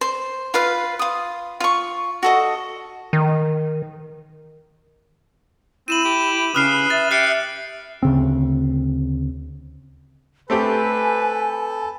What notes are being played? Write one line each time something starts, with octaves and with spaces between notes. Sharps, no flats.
C5
F4 B4 F5
F4 D#6
F4 C#6
F#4 A4 D#5
D#3
C4 E4 D#7 E7 F#7
G4
C#3 B4 D#6 F6 C7
E5 A6
G4 E5 F#6 C7 C#7
D2 C#3 C4
A3 C4 G4 A4 B4 G#5